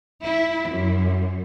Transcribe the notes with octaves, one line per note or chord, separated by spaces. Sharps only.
E4
F#2